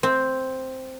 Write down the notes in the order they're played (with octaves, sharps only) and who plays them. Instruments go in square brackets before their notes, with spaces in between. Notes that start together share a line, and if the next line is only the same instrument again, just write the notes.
[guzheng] C4